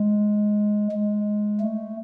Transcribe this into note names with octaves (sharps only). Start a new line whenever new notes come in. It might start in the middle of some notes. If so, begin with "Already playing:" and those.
Already playing: G#3
G#3
A3